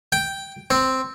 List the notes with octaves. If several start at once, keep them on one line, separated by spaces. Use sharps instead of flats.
G5
C4